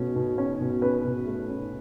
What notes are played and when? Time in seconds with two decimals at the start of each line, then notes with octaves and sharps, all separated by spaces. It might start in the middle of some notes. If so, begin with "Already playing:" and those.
Already playing: B2 A3 C#4
0.16 B2
0.38 C#4
0.61 B2
0.82 C#4 B4
1.04 B2
1.26 A3
1.49 C#4